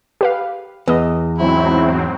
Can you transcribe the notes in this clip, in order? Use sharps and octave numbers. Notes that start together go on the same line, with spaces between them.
G4 B4 F5
E2 B3 D#5
G#2 F#3 C4 E4